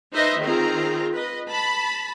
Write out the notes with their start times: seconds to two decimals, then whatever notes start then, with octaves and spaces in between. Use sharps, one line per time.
0.12 D#4 B4 C5 D#5 E5
0.41 D#3 C4 F4 G#4 A#5
1.12 B4 D#5
1.50 A5 B5